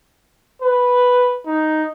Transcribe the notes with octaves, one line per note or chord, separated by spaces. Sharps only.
B4
D#4